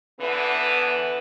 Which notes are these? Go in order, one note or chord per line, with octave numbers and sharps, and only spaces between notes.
D3 E3 B3 E4 B4